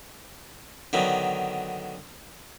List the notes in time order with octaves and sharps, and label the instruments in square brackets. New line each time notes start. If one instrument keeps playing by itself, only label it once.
[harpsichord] D3 D#3 F#3 B3